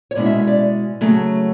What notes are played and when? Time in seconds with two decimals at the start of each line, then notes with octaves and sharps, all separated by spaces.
0.11 C#5
0.15 B2 G#3 C#4 E4 D5
0.26 E5
0.47 D5
1.01 C#3 F#3 A3